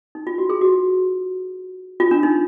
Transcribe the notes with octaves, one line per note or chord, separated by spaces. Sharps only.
D#4
F4
F#4
G#4
F#4
F4
D4
D#4